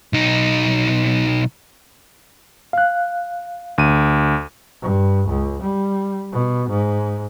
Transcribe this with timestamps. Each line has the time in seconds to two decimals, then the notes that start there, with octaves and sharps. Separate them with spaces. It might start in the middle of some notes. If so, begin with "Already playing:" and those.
0.13 B1 D#4
2.73 F5 F#6
3.78 D2 D#7
4.82 G2
5.28 C#2
5.62 G3
6.32 B2
6.69 G#2